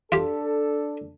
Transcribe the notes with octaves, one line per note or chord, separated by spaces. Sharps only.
D4 F4 G4 A4